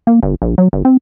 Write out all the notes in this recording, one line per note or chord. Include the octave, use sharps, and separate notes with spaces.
A#3
G1
A#1
F#3
G1
C4